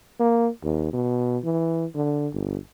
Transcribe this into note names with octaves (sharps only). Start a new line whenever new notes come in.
A#3
D#2
B2
E3
D3
G1